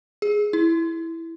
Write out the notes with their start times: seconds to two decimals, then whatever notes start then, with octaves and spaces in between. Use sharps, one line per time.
0.22 G#4
0.53 E4